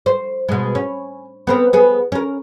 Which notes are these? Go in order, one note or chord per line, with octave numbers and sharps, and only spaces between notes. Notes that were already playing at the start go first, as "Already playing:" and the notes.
C5
B2 G#3
C#4
B3 C4 A#4
B3 G#4
C#4 A#4